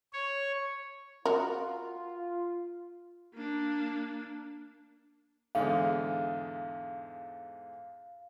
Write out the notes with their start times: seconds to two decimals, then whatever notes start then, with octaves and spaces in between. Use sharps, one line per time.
0.13 C#5
1.26 F4 F#4 A#4
3.34 A#3 D4
5.55 E2 G#2 D3 F5